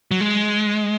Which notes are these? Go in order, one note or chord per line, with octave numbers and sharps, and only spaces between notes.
F#3
G#3